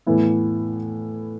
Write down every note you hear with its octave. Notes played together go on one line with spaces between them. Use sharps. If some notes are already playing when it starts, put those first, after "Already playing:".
A2 E3 B3 E4